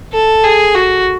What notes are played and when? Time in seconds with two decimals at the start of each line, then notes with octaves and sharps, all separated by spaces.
0.13 A4
0.44 G#4
0.75 F#4